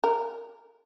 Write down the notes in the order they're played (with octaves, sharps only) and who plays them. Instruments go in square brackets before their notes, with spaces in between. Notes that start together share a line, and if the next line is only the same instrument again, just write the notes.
[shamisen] A#4